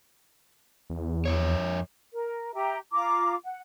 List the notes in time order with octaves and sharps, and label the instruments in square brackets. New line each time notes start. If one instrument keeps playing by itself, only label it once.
[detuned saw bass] E2
[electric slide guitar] F2 C#3 C#5
[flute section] A#4
G4 E5 A#5
F4 A#5 D6
F#5